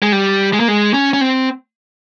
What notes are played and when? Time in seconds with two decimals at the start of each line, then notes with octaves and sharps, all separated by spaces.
0.02 G#3
0.12 G3
0.53 G#3
0.60 A#3
0.68 G#3
0.94 C#4
1.13 C#4
1.21 C4